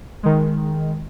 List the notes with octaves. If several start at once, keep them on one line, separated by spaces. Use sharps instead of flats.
D#3 G#3